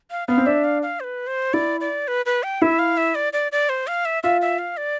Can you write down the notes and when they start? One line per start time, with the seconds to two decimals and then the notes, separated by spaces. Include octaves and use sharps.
0.11 F5
0.28 B3 F5
0.37 C4
0.46 D4 E5
0.64 F5
0.82 F5
1.00 C5
1.04 B4
1.27 C5
1.53 E4 D5
1.81 D5
2.08 B4
2.26 B4
2.43 G5
2.62 E4 E5
2.79 F5
2.97 E5
3.15 D5
3.33 D5
3.52 D5
3.69 C5
3.87 F5
4.05 E5
4.23 F4 E5
4.41 E5
4.59 F5
4.77 D5